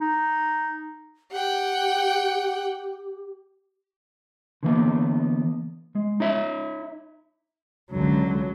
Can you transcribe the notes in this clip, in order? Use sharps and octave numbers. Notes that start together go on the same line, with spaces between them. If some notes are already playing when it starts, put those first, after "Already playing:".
D#4
G4 F#5 G5
D3 E3 A#3 B3
G#3
D#4 C#5 E5
C#2 D3 F#3